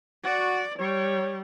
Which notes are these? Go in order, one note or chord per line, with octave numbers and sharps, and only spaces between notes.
F#4 D5
G3 C#5